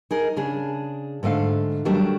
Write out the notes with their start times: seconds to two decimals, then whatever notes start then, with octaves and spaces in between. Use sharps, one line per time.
0.11 D#4 G#4 A#4
0.36 C#3 D4 G#4
1.23 G#2 D3 A3 F5
1.85 D#3 F#3 G3 A3 D4